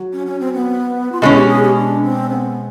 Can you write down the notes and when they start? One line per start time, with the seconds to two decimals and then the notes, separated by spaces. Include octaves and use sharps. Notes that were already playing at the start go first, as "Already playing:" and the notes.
Already playing: F#3
0.13 C#4
0.26 C#4
0.40 C4
0.54 B3
1.12 F4
1.21 B2 G#3 C#4 E4
1.35 G4
1.48 G#4
1.63 G4
1.76 D4
2.02 C4
2.30 B3